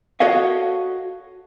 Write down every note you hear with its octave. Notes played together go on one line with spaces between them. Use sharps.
F#4 A4 C#5 D#5 F5